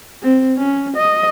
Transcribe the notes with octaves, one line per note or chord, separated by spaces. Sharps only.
C4
C#4
D#5